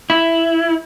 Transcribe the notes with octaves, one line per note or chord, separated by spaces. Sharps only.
E4